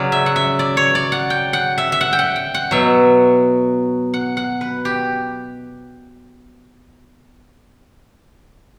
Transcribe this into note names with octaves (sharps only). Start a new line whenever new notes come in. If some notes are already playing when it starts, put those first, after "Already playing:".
Already playing: C#3 F#3 D5
E5
F#5
E5
D5
C#5
D5
F#5
G5
F#5
E5
E5
F#5
G5
F#5
G5
F#5
B2 F#3 E5
F#5
F#5
B4
G4